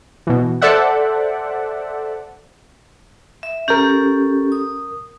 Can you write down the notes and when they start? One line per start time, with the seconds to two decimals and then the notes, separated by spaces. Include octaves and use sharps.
0.27 B2 E3
0.61 A4 C5 D5 E5 F#5
3.43 E5
3.68 C#4 G4 A4 A#4 G6
4.52 D#6